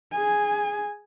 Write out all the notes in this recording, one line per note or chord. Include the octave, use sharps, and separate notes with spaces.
G#4 G#5